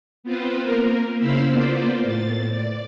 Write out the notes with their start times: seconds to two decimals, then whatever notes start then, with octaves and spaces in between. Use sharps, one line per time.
0.24 B3 C4 F4 B4 C5
0.61 A#3 A#4
1.18 C#3 E4 C5 F5 B5 E6
1.49 A#3 B3 F4 C5 D5
2.03 A2 A6
2.52 D5